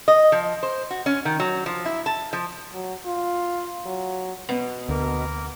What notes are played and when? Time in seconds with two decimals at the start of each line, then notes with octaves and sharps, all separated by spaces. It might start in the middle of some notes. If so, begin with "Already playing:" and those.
0.08 D#5
0.32 F3
0.63 C5
0.91 F#4
1.06 C#4
1.25 D#3
1.40 F#3
1.66 F3
1.85 E4
2.06 A5
2.33 F3
2.73 F#3
3.05 F4
3.86 F#3
4.49 B2 B3
4.89 D2 A#3 A#4